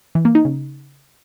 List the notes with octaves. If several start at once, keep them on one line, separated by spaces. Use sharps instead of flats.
E3
A#3
D#4
C#3